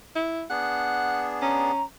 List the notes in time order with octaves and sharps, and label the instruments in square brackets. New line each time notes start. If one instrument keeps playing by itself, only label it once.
[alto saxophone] E4
[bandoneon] B3 D4 G#4 [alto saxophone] F#5
[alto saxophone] C#4 [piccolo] A#5